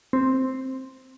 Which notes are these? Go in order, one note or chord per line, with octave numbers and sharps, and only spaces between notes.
C4